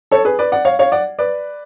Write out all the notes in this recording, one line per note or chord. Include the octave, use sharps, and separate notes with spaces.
A4 C#5
G#4 B4
B4 D5
D5 F#5
C#5 F5
C#5 F5
D5 F#5
B4 D5